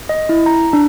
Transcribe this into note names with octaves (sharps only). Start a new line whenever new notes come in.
D#5
E4
A#5
D4